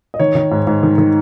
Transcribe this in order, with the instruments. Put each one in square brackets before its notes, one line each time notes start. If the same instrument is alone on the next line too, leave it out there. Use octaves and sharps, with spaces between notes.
[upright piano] D#5
D#3 C#5
D#3
G#2
G#2
D#3
D#3